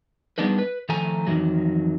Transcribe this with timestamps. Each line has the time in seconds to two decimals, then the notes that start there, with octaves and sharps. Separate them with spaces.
0.38 G3 G#3 B3 D4 D#4 B4
0.59 B4
0.89 D#3 F3 A3 A4 G#5 A#5
1.27 F2 A2 D#3 E3 F#3